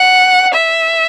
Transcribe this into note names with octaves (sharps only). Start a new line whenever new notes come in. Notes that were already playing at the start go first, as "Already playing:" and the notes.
Already playing: F#5
E5